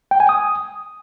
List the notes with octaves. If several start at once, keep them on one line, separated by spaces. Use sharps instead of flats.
G5
G#5
D#6